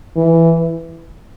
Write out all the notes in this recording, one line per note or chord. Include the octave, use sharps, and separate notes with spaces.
E3